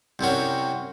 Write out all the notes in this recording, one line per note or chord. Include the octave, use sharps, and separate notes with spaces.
C2 C3 F#3 C#4 F#4